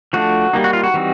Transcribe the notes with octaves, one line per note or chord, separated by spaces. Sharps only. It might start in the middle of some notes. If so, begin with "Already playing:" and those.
F3 A3 D4 F#4
G3 A#3 D#4
F#4
F4
F#4
E3 G3 C4 D#4